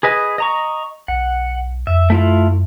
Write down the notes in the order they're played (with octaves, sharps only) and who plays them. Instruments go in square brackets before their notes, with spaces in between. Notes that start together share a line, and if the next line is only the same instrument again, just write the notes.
[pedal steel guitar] G#4 B4 D#5
D#5 A#5 C#6
[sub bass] B1 [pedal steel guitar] F#5
[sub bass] F2 [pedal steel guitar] E5
[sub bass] F#2 [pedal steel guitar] A3 E4 F4